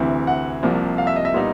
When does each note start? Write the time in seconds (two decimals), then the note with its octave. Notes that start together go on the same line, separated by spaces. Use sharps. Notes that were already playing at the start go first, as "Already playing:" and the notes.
Already playing: D2 C3 E3
0.27 F#5
0.63 C2 C3 F3 A#3
0.98 F5
1.07 E5
1.16 D#5
1.25 E5
1.34 A#2 G3 B3 D#4